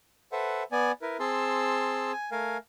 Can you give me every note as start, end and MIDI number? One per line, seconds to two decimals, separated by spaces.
0.32 0.63 69
0.32 0.63 71
0.32 0.63 72
0.32 0.63 76
0.32 0.63 78
0.72 0.92 59
0.72 0.92 74
0.72 0.92 80
1.02 1.17 64
1.02 1.17 70
1.02 1.17 71
1.20 2.12 60
1.20 2.12 68
1.20 2.12 81
1.20 2.12 84
1.20 2.12 88
2.13 2.30 80
2.32 2.57 57
2.32 2.57 70
2.32 2.57 77
2.32 2.57 80